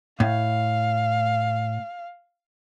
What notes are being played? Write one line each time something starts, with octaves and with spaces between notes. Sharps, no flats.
A2 F5